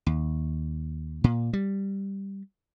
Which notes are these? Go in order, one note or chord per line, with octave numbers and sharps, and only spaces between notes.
D#2
A#2
G3